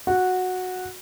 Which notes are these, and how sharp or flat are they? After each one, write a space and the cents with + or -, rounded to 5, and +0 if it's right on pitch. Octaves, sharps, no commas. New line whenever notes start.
F#4 -10